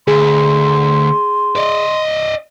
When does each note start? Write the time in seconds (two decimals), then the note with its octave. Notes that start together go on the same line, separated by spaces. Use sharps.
0.08 D2 G#4 C6
1.56 D5 D#5